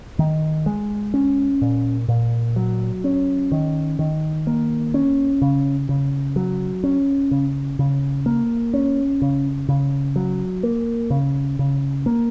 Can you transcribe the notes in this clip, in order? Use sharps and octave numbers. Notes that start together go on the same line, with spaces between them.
D#3
G#3
C#4
A#2
A#2
F#3
C#4
D#3
D#3
A#3
C#4
C#3
C#3
F#3
C#4
C#3
C#3
A#3
C#4
C#3
C#3
F#3
A#3
C#3
C#3
A#3